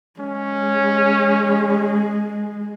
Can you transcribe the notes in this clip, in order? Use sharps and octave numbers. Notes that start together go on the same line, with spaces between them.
G#3 C#4